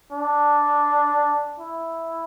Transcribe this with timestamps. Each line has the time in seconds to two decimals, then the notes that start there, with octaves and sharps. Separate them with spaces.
0.12 D4
1.59 E4